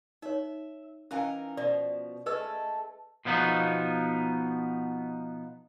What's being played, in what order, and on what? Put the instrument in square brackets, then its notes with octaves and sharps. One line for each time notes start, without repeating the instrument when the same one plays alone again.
[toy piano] D#4 C#5 [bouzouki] E5
[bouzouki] E3 D#4 A#4 [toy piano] C#4 F5 G#5
[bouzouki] B2 F3 [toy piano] D5
[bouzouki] G#3 A3 A4 [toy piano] B4 D#5 E6
[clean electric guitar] B2 F3 B3 D#4